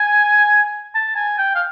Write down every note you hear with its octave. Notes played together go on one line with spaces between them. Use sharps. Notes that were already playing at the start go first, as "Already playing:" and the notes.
Already playing: G#5
A5
G#5
G5
F5